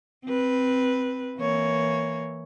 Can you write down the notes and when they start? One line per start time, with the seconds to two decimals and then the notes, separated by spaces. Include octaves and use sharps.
0.25 C4 B4
1.38 E3 A#3 C#5